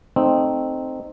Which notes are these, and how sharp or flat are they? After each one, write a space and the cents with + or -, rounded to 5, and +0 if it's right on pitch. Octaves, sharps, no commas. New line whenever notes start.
A3 +0 C4 +0 D#4 -15